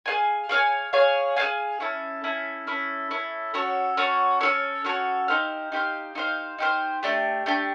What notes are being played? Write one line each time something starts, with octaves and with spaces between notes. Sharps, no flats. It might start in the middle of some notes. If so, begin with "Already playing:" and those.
G#4 C#5 F5 G#5
G#4 C#5 F5 G#5
G#4 C#5 F5 G#5
G#4 C#5 F5 G#5
C#4 E4 A4
C#4 E4 A4
C#4 E4 A4
C#4 E4 A4
C#4 F#4 A4 C#5
C#4 F#4 A4 C#5
C#4 F#4 A4 C#5
C#4 F#4 A4 C#5
D#4 G4 C5 F5
D#4 G4 C5 F5
D#4 G4 C5 F5
D#4 G4 C5 F5
A3 D4 G4
A3 D4 G4